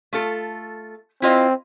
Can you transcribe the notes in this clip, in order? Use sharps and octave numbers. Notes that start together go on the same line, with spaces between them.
A3 F4 A4
C4 E4 F4 D#5